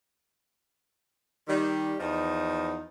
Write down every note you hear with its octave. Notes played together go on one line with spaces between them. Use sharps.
D#3 G3
E2 F3 D#4